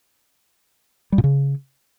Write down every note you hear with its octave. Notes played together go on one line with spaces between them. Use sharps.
G3
A#2
C#3